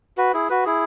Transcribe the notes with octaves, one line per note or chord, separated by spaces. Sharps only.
F#4 B4
E4 G#4
F#4 B4
E4 G#4